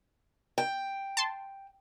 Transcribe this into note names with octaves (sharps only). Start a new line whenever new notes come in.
G5
A5 C6